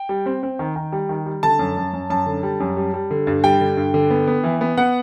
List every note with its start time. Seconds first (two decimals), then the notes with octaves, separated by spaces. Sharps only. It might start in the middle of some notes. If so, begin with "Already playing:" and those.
Already playing: G5
0.09 G3
0.26 C4
0.43 C4
0.59 D#3
0.76 D#3
0.92 G3
1.09 D#3
1.26 G3
1.43 D3 A5
1.59 F#2
1.77 F#2
1.93 F#2
2.10 F#2 A5
2.26 D3
2.43 G3
2.60 F#2
2.77 G3
2.94 G3
3.11 D3
3.27 G2
3.44 G3 G5
3.61 D3
3.77 G2
3.94 D3
4.10 B3
4.27 B3
4.43 E3
4.61 B3
4.78 B3 F#5